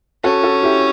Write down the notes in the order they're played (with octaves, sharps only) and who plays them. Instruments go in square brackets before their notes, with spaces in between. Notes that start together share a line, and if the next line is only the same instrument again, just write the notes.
[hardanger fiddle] C#4 [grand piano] F#4 A4
[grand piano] F#4 A4
E4 G4